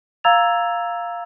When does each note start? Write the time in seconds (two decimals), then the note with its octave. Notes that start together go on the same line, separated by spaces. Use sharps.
0.24 F5 A#5 E6 G#6 A6 F7